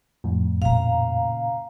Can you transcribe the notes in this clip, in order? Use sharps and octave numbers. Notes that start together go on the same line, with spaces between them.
F2 A2
A#2 C#3 F5 A#5